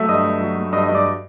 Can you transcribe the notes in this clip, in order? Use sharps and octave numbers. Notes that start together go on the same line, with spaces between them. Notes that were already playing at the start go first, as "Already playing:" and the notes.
Already playing: F#3 A3 E5 E6
G2 D#5 D#6
A3
F#3
A3
G2 D#5 D#6
D#5 D#6
G2
D5 D6